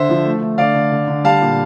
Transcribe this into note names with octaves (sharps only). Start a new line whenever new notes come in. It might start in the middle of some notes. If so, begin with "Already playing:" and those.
Already playing: D3 C5 E5
F3
A3
A3
D3 D5 F5
D3
D3
D3
G3 F5 A5
A#2